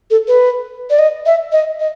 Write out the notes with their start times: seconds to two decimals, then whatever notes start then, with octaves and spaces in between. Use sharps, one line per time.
0.11 A4
0.28 B4
0.90 D5
0.99 D#5
1.26 E5
1.52 D#5
1.80 D#5